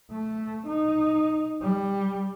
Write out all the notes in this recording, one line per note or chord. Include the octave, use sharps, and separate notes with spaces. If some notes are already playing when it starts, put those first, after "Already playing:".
A3
D#4
G3